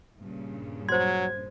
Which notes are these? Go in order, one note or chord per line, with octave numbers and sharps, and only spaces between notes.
G2 A#2 C#3
F#3 C5 C6 G#6